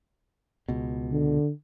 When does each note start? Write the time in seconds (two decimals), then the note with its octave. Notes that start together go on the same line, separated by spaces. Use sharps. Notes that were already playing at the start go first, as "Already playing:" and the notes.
0.68 C#2 B2
1.12 D3